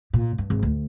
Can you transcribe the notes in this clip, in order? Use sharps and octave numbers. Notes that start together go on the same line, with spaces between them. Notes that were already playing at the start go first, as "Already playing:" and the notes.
A#2
G2
G#1
D2